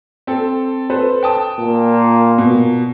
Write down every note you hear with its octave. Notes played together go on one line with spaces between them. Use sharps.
C4 A4
A4 B4 C5
G5 A5 D#6
A#2
B2